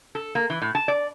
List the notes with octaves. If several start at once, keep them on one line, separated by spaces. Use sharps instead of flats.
A4
A#3
E3
A2
A5
D5